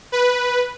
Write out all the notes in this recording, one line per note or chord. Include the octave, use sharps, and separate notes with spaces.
B4